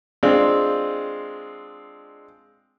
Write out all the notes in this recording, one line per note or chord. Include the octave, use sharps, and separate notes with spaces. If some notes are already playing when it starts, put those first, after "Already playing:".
G#3 C4 D4 F4